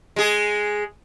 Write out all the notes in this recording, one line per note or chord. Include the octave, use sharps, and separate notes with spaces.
G#3 G#4